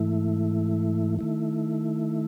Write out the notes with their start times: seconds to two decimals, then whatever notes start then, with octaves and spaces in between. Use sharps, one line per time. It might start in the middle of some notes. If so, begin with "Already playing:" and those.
Already playing: G#2 E3 A3 E4
1.19 D#3 A3 E4